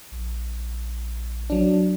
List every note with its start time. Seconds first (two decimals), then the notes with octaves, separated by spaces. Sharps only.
0.12 A#1
1.50 F#3 D4